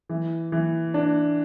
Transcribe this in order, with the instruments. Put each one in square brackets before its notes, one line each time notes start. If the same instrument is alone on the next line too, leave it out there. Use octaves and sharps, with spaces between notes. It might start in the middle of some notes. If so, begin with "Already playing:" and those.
[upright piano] E3
E3
D4